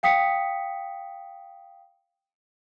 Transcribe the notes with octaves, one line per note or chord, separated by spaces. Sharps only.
F5 G5 D#6 B6 C#7